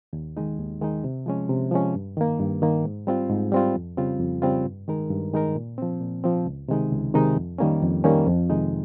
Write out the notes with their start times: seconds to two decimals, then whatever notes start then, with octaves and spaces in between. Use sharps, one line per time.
0.13 D#2
0.37 D#3 G#3 D#4
0.59 D#2
0.81 D#3 G#3 D#4
1.04 C3
1.26 F3 G#3 C#4
1.49 C3
1.71 F3 G#3 C#4
1.95 G2
2.17 D#3 A#3
2.39 G2
2.62 D#3 A#3
2.84 G#2
3.07 G3 C4 F4
3.29 G#2
3.52 G3 C4 F4
3.75 F2
3.97 C#3 G3 C4 F4
4.20 F2
4.42 C#3 G3 C4 F4
4.65 G2
4.87 D#3 G#3 D#4 A#4
5.10 G2
5.33 D#3 G#3 D#4 A#4
5.55 A#2
5.78 F3 C4
6.01 A#2
6.24 F3 C4
6.46 C#2
6.68 C3 D#3 G#3 D#4
6.92 C#2
7.14 C3 D#3 G#3 D#4
7.36 F2
7.58 D#3 G3 A#3 C#4
7.82 F2
8.04 D#3 G3 A#3 C#4
8.27 F2
8.49 C3 D#3 G#3 D#4